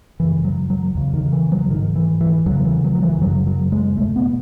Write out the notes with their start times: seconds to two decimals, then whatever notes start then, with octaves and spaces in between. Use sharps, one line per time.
0.20 F#2 C#3 E3
0.45 F#3
0.70 F#3
0.95 E2 C#3
1.14 D#3
1.33 E3
1.52 F#3
1.70 G#2 D#3
1.96 E3
2.21 E3
2.46 E2 F#3
2.49 C#3
2.65 E3
2.84 F#3
2.95 F#3
3.03 E3
3.21 F#2 F#3
3.26 C#3
3.47 F#3
3.72 G#3
3.97 E2 B2 A3
4.16 B3